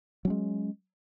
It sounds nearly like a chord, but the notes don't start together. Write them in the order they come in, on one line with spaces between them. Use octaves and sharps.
F#3 C#4 G#3